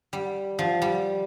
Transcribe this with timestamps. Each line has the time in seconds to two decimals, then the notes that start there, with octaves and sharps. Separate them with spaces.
0.13 G3
0.59 F3
0.82 G3